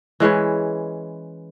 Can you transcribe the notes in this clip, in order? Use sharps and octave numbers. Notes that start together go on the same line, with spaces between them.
E3 G#3 C#4 B4